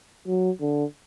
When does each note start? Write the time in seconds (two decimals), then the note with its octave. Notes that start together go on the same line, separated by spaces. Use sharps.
0.27 F#3
0.61 D3